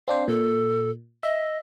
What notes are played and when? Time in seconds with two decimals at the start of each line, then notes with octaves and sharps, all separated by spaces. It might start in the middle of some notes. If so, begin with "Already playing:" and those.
0.08 C4 D4 C5 F5
0.28 A#2 A4
1.23 D#5 E5